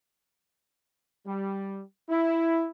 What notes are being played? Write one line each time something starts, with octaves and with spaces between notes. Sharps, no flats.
G3
E4